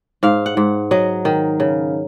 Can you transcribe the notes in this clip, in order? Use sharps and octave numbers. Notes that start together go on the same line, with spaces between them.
G#2 F5
F#5
G#2
F#3 D#5
D#3
C#3